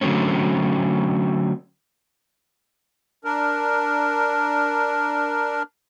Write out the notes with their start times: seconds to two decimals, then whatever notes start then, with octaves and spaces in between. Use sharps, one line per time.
0.01 D3 F#3 A3 C4 C#4
3.25 D4 A#4